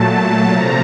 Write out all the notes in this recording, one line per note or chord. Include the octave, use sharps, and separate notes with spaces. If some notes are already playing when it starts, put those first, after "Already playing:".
Already playing: A#2 F#3 A3 A5
C3 F3 A3 A#5